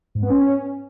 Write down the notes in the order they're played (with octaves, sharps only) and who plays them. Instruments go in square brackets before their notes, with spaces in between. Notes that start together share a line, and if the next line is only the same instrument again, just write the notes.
[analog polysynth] G#2
B3
C#4